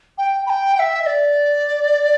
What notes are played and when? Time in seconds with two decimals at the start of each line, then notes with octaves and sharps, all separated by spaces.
0.18 G5
0.46 B5
0.50 G5
0.75 G5
0.79 E5
1.02 E5
1.06 D5